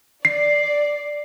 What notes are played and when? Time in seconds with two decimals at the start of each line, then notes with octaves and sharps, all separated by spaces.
0.25 D5 C7